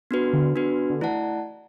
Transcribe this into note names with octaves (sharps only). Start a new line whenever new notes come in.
B3 D4 F#4 B4
D3
B3 D4 F#4 B4
D3
E3 A3 E4 D5 F#5 A5